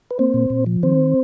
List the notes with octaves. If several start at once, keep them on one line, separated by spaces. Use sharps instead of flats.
B4
A#3 C4 C5
A#2
A#2
F3
D#3 C4 C5